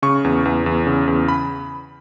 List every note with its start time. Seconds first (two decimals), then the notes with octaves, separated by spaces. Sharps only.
0.02 C#3 C#6
0.24 E2
0.45 E2
0.66 E2
0.87 C#3
1.08 E2
1.28 B5